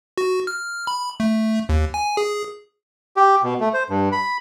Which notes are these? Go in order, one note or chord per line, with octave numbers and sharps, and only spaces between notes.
F#4
F6
B5
A3
D#2
G#5
G#4
G4
B2
A3
C5
G2
B5